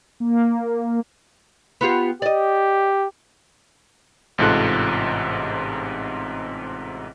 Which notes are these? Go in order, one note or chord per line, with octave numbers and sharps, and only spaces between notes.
A#3
B3 F4 G4
G4 D5 D#5
A1 G#2 C3 F4 A4 F#6